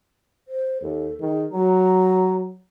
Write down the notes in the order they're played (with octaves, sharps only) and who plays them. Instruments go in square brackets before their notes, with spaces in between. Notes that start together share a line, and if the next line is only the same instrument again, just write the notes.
[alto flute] C5
[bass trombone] D#2 [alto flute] A4
[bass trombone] D#3 [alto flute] G#4
[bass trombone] F#3 [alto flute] A#5